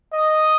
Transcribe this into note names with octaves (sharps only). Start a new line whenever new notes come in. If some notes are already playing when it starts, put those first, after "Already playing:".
D#5